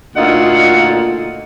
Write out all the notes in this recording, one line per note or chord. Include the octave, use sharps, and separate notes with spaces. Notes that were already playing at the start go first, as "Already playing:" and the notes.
D2 A#2 D#4 F4 D#5 F#5